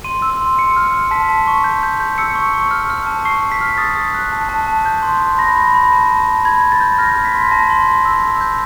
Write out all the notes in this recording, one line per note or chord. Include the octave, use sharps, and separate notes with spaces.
C6 D#7
E6
C6
C6 C#7
F6
F6
A5 B6
A5
C#6
G6
G6
G6
E6 C#7
C#6
C#6
F6
F6
A5
C#6 C7
C#6
B6
F6
D#6 A6
D#6
F#6
A5
A5
A5
G6
C6
C6
B5 A#6
B5 A#6
B5
A5
A5
A5
B5 G#6
B5
A6
G6
F6 A#6
F6
B6
C6
A5 A#6
C6
C6
E6
E6
G6